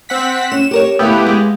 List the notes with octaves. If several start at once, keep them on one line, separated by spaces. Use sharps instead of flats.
C4 F#5 B6
C#4 E7
G4 A#4 C#5
D2 A3 B3 E4 G4 F5
G#3 F5